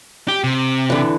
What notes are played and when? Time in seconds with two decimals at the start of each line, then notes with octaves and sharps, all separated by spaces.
0.28 G4
0.44 C3
0.90 D3 E3